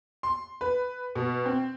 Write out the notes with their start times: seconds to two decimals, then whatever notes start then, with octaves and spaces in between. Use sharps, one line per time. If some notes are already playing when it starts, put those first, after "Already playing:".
0.23 C6
0.61 B4
1.15 B2
1.46 C4